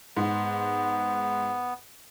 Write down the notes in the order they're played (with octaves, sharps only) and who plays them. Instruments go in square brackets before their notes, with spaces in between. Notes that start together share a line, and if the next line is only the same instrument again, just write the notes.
[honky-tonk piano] G#2 [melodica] B3